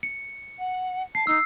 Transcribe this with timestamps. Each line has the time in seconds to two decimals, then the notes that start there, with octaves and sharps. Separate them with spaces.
0.03 C#7
0.59 F#5
1.15 A5 C7
1.27 D#4 E6 C7